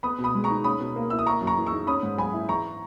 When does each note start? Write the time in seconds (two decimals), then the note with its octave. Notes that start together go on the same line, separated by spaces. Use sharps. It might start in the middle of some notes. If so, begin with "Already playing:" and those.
0.03 B3 B5 D#6
0.18 B2
0.24 B5 D#6
0.35 G#3
0.44 A#5 C#6
0.50 D#4
0.64 C#4 B5 D#6
0.80 B2
0.96 A#3
1.10 E4 E6
1.19 D#6
1.26 A#3 A#5 C#6
1.41 F#2
1.47 A#5 C#6
1.58 E3
1.67 C#6 E6
1.72 D#4
1.87 C#4 B5 D#6
2.03 G#2
2.18 F#3 G#5 B5
2.33 E4
2.48 E3 A#5 C#6